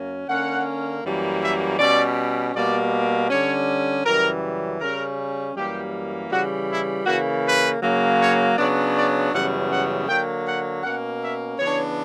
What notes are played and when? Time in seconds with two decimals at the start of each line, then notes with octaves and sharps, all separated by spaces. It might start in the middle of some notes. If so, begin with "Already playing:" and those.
Already playing: F#2 A#3 C#4
0.28 D3 A#3 C#4 F#5
1.04 F#2 E3 G3 A#3
1.41 E5
1.79 B2 G3 C#4 D5
2.55 B2 G3 A#3 D5
3.30 D3 G3 C#4 C#5
4.05 F#2 C#3 E3 G3 A#4
4.81 C#3 G3 C#4 A#4
5.56 F#2 E3 G3 A#3 G4
6.31 C#3 E3 G3 F#4
6.69 E4
7.06 C#3 E3 A#3 F#4
7.45 B4
7.82 C#3 F#3 A#3
8.19 C#5
8.57 C#3 F#3 B3 D4 D5
8.96 D5
9.32 F#2 C#3 E3 G3 B3 F#5
9.71 F#5
10.08 D3 F#3 A#3 G5
10.46 F#5
10.83 B2 A#3 C#4 F#5
11.21 E5
11.59 C#3 E3 B3 D4 C#5